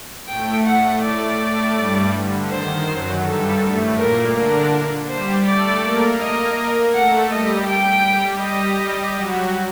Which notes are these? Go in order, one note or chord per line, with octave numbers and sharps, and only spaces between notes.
A2 A3 G5
F#5
D5
A2 A3
G2 G3
D3
D#3 C5
F#2 F#3
G2 G3 A4
A2 A3
A#2 A#3 A#4
D3 D4 A#4
G3 G4 C5
A3 A4 D5
A#3 A#4
D#5
A3 A4 F#5
G3 G4 D#5
G5
G3 G4
G3 G4 D#5
G3 G4
F#3 F#4